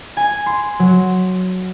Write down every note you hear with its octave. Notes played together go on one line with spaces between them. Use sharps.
G#5
C6
F#3